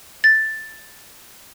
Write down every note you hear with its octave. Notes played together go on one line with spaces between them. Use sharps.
A6